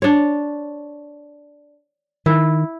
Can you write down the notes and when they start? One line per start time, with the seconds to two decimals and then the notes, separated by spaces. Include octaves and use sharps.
0.02 D4 C#5
2.26 D#3 E4